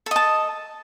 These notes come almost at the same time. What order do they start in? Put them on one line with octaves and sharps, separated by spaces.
A4 D#5 A5